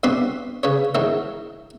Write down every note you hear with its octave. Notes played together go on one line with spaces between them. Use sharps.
G2 B2 C4 B4 C6 D6
C#3 B4 C#5
G#2 D#3 F#3 E4